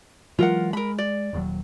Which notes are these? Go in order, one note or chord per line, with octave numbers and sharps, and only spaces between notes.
E3 F#3 G#3 F4 A#4 F#5
G#3 A#4 B5
D5
D#1 D#2 F#3